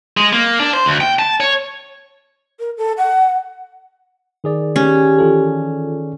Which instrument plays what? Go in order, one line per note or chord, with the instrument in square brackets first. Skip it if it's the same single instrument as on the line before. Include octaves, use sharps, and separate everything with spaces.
[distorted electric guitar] G#3
A#3
D4
C5
D2
G5
A5
C#5
[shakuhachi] A#4
A4
F#5
[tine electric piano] D#3 G#4 D5
[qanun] C#4 [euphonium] G4
[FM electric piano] E3 F4 A4